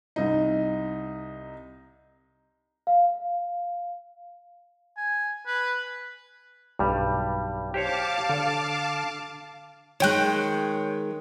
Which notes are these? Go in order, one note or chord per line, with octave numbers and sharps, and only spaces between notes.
C2 D#4
F5
G#5
B4
B1 G2 G3
G4 C5 C#5 F5 A5 D6
D3 A4
D#3 G#3 C#5 G5 F#6